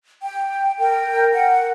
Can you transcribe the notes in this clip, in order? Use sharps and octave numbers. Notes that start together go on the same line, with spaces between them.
G5
A#4 G5
F#5